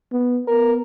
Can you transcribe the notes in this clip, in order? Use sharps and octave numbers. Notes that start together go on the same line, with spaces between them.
B3
B3 A#4